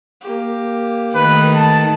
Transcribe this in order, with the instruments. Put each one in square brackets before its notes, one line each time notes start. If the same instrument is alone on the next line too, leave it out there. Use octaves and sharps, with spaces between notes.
[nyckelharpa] A#3 G4
[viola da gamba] D#3 A3 [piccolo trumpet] B4
[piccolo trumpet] A5